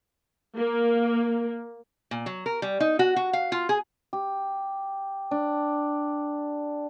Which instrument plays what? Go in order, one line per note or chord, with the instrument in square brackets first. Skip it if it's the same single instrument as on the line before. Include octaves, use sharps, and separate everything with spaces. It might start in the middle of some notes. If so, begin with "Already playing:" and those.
[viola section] A#3
[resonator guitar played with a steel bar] A#2
F#3
A#4
G3
D#4
F#4
F#4
F5
F4
G#4
[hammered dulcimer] G4
D4